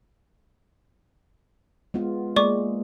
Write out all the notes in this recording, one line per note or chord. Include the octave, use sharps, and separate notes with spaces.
G#3 B3 F4
G#3 A#3 D5 C#6 D6